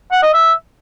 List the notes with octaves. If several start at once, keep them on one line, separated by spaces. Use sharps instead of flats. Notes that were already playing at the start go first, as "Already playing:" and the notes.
F#5
D#5
E5